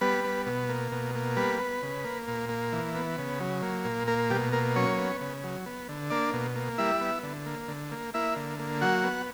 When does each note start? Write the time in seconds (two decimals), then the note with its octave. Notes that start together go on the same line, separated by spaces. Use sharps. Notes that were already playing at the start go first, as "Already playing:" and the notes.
0.01 G3 B3 B4
0.24 B3
0.46 B2
0.69 A#3
0.92 B2
1.15 A#3
1.36 G3 B3 B4
1.59 B3
1.83 C#3
2.04 A#3
2.28 A#2
2.49 A#3
2.72 E3
2.95 B3
3.18 C#3
3.40 F#3
3.63 A#3
3.85 A#2
4.08 A#3 A#4
4.30 B2 G3 G4
4.52 A#3 A#4
4.76 F#3 C#4 C#5
4.98 B3
5.21 C#3
5.44 F#3
5.66 B3
5.89 D3
6.10 A#3 D4 D5
6.33 B2
6.56 A#3
6.78 G3 E4 E5
7.01 B3
7.23 D3
7.46 A#3
7.68 D3
7.91 A#3
8.14 A#3 E4 E5
8.36 D3
8.59 A#3
8.81 F#3 F#4 F#5
9.04 B3